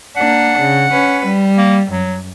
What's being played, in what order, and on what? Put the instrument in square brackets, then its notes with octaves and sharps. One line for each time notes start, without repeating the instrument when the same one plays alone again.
[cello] A#3 D4 [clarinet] F#5
[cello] C#3
C#4 B4
G3
[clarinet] A#3
[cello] F#2 [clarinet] F#3